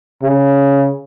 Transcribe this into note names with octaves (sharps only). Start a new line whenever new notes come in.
C#3